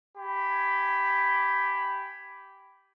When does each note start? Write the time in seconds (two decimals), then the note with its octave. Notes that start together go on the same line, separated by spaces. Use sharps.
0.18 G4 G#5 B5